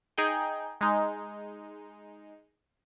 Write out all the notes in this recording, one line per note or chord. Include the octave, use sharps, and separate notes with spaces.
D#4 G#4 G5
G#3 D#4